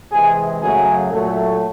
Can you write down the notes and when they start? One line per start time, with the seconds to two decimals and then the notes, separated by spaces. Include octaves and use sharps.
0.11 C3 E3 G#3 G#4
0.61 F#2 C#3 F#3 A3 G#4
1.09 A#2 F#3 A3